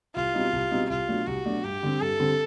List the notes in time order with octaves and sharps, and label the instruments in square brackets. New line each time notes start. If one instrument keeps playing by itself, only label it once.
[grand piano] C2 [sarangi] F4
[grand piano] B2 G3 C4 D#4
C2
B2 G3 C4 D#4
[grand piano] C2 [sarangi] F4
[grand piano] B2 F#3 A3 D4
[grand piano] C2 [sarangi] F#4
[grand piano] B2 F#3 A3 D4
[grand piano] G2 [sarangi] G4
[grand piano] D3 G3 C4
[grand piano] G2 [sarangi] A4
[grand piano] D3 G3 C4